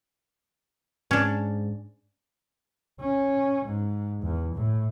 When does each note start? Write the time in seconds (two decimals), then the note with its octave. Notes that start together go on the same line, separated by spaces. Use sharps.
1.11 G#2 C#4 D4
3.01 C#4
3.66 G#2
4.22 E2
4.55 A2